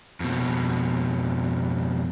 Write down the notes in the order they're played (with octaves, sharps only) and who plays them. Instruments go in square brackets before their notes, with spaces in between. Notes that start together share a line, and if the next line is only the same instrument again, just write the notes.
[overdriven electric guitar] F2 B2